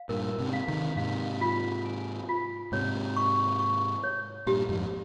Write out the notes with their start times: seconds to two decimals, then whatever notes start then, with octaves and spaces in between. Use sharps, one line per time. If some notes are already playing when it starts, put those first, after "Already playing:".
Already playing: F5
0.09 G2 A#2 A#4
0.39 G#2 C3
0.53 F5
0.68 C3 D#3
0.97 G#2 C3 F5
1.41 F4
1.85 G#5
2.29 F4
2.72 G#2 C3 C#5
3.16 C#6
3.59 C#6
4.04 C#5
4.47 G2 A#2 G4
4.69 F2 G#2